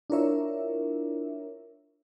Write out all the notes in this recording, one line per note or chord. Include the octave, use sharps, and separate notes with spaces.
D4 E4 F4 A#4 C#5 E5